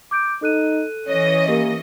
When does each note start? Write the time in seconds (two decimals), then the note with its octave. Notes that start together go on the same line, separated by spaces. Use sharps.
0.11 D6 G6 D7
0.42 D#4 A4 F#6 D#7
1.08 E3 C#4 C#5 D#5
1.48 A#3 G4 A#4